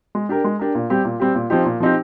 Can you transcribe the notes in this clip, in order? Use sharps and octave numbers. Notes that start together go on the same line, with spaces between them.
G#3
D4 G4 A#4
G#3
D4 G4 A#4
A#2
G3 C4 G4
A#2
G3 C4 G4
A#2
F3 C4 D#4 G4
A#2
F3 C4 D#4 G4